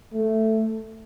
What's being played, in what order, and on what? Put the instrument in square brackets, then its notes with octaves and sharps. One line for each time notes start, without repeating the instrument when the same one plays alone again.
[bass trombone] A3